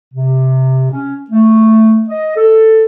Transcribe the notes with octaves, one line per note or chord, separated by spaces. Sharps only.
C3
C#4
A3
D#5
A4